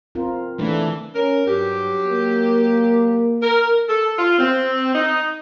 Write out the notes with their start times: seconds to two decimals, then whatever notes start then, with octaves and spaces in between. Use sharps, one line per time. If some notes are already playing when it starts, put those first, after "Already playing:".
0.15 C4 F4 A#4
0.59 E3 A3 D4 B4
1.15 C#4 A#4
1.47 G2 F#3 G4
2.07 A#3
3.42 A#4
3.88 A4
4.17 F4
4.39 C4
4.94 D#4